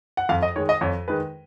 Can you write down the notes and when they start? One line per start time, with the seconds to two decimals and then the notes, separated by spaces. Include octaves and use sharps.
0.17 F#5
0.29 F2 F5
0.43 D#5
0.56 D#3 G#3 C#5
0.69 D#5
0.81 F2 C#5
1.08 D#3 G#3 B4